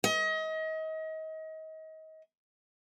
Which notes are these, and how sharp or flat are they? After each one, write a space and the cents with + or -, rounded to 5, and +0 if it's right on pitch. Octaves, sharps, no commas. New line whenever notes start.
D#5 +30